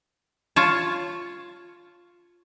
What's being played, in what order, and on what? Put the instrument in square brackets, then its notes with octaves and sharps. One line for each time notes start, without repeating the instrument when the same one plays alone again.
[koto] F4 C#5 A5